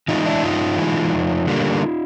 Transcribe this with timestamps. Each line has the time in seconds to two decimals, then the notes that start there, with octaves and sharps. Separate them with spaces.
0.08 E3 G#3 D#4 F4
0.26 D4 E4
0.43 G2 D#4 F4
0.78 E3 G#3
1.12 F2
1.47 D3 G3 A#3